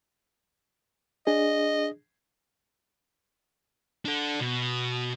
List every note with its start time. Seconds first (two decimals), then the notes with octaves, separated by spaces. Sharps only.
1.27 D4 G#4 D#5
4.05 D4 A4
4.40 B2